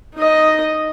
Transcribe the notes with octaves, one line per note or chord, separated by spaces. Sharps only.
D#4 D#5